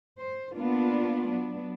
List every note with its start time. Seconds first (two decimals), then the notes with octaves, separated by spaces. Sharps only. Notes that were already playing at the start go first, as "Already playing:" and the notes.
0.19 C5
0.55 A#3 B3 D4 F4
1.29 F#3 B3 D4